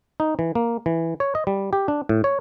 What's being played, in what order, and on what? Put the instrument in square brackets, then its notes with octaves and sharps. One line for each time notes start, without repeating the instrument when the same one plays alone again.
[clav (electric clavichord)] D#4
E3
A#3
E3
C#5
D#5
G3
G4
D4
A2
C#5